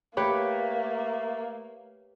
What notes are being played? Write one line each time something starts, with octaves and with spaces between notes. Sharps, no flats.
A3 A#3 G4 B4 C#5